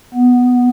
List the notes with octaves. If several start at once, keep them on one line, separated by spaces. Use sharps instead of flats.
B3